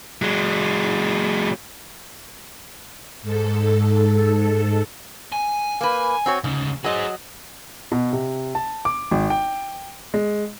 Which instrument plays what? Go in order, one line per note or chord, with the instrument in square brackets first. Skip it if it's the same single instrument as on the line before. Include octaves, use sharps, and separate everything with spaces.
[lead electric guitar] F#3 G#3
[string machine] G#2 A4
[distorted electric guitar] G#5
[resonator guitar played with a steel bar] A#3 B4
C4 F#4 C#5
[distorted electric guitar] D2 C#3 [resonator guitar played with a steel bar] G#2
[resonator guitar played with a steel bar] F#3 D#5 [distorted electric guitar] G#4 C5
[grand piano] B2
C3
A5
D6
G#1
G5
G#3